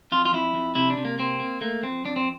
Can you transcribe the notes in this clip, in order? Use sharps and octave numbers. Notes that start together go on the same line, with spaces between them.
F2 F4
F4
F2 E4
F2
C3 E4
D4
C3
A#3
A#3 C4
A#3
A3 A#3
F2 C4
F2 D4
C4